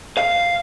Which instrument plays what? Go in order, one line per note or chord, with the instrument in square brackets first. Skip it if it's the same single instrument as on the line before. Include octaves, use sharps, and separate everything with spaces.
[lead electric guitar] F5